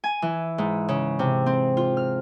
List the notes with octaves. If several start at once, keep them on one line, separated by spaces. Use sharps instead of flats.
G#5
E3
G#2
C#3
C3
C4
F4
F6